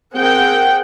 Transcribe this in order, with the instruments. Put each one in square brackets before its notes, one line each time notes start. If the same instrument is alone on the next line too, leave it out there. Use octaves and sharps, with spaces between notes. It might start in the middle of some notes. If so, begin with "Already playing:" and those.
[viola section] C4 G#4 A#4 F#5 G5